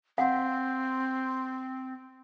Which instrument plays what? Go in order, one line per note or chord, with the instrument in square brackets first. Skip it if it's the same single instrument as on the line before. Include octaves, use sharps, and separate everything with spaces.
[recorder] C4 [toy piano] F5 F#5